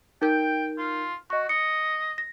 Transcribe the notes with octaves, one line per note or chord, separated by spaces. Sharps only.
D#4 A#4 G5 G6
F4
F#4 D#5 C#6
D#5 C#7
A#6